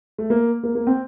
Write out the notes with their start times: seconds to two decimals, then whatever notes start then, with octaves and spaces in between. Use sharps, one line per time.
0.18 A3
0.30 A#3
0.63 A#3
0.75 A#3
0.87 C4